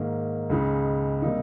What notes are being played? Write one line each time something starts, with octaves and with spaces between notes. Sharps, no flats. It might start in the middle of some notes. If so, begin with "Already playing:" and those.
Already playing: G#2 D#3 A#3
C#2 C#3 G#3 D#4
C3 G3 A#3 D#4